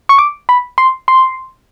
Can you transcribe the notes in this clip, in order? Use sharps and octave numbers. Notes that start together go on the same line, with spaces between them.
C#6
D6
B5
C6
C6